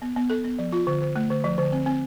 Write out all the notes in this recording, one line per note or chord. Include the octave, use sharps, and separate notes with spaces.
B3
B3
A4
B3
F3
F4
D3
D3
A3
D3
F3
D3
C4
C4